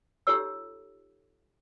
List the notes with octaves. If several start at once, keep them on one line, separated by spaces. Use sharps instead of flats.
D#4 F4 G4 A4 C#5 E6